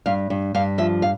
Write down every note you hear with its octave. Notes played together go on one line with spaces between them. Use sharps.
G2 F5
G2
G2 F5
F3 E5
F5